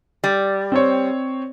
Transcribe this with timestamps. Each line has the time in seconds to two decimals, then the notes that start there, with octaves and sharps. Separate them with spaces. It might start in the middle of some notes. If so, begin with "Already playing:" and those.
0.24 G3
0.72 C4 C5 C#5